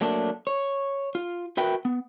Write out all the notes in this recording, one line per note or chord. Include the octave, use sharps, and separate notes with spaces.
F#3 A3 A#3 D4
C#5
F4
F#4 A#4 B4 E5 G5
B3